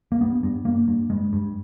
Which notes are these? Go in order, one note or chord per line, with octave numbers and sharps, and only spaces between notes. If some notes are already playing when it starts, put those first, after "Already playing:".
A#3
G2 B3
G2
G2 A#3
G2
G2 G#3
G2